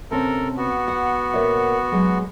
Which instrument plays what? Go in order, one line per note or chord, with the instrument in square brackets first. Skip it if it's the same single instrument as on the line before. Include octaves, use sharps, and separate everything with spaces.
[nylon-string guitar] C3 C4 C#4 [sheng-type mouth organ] A4 A#4
[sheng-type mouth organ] B3 F#4
[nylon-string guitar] F#5
A#2 C#5 E5
F#3 G#3